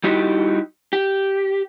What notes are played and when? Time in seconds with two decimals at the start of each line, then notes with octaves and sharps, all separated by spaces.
0.04 G3 D#4 E4 F#4 G4
0.93 G4